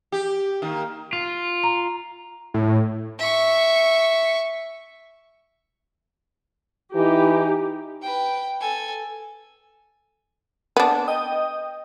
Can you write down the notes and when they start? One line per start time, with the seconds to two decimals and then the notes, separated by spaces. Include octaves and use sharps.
0.12 G4
0.62 D#3 A#3
1.13 F4
1.64 A#5
2.54 A2
3.19 E5 C#6
6.95 E3 D#4 G4
8.02 B4 G5
8.60 A4 G#5
10.77 B3 D4
11.08 D#5 G5 D#6